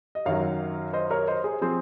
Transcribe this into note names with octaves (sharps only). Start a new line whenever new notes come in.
D#5
F#2 D#3 F#3 C#5 F5
C5 D#5
A#4 C#5
C5 D#5
G#4 C5
F3 C4 G#4 C5